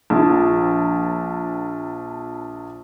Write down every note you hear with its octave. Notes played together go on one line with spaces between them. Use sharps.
A#1 F3